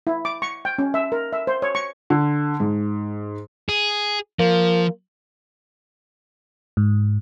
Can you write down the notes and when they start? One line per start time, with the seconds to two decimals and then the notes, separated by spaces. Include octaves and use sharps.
0.07 E4
0.25 D6
0.42 C#6
0.65 G5
0.78 C#4
0.94 E5
1.12 A#4
1.33 E5
1.47 C5
1.62 C#5
1.75 C#6
2.10 D3
2.60 G#2
3.69 G#4
4.39 F3 A#3
6.77 G#2